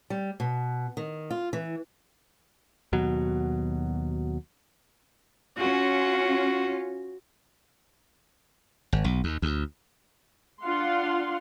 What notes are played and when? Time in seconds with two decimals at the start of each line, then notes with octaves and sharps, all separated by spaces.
0.10 G3
0.40 B2
0.97 D#3
1.31 F4
1.53 E3
2.93 D#2 B2 F#3
5.58 C#4 F4 F#4
8.93 G#1
9.04 B1
9.24 D#2
9.42 D2
10.63 D4 F4 F5 F#5 C6